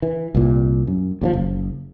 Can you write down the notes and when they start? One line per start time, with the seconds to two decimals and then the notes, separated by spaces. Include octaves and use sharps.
0.02 E3
0.34 C2 A#2
0.87 F#2
1.21 D#2 C#3 F3
1.33 F#1